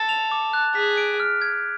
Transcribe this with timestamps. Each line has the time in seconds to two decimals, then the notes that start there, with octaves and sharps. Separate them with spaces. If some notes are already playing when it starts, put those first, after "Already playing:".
Already playing: A4 A6
0.09 F7
0.32 D6
0.53 F#6
0.75 G#4 B6
0.97 D7
1.20 F6
1.42 G#6